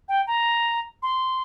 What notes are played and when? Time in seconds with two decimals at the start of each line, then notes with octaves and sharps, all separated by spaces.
0.09 G5
0.27 A#5
1.03 C6